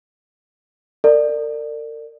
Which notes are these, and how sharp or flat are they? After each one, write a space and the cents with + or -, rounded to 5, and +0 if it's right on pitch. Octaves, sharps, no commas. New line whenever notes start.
A#4 -40 D5 +15